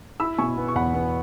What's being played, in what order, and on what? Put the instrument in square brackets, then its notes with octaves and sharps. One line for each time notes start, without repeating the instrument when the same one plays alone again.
[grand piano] E4 [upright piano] B5 E6
[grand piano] B2 [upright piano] G#5 C#6
[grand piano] B3
[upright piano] C#6
[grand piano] E2 [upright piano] F#5 B5
[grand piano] B3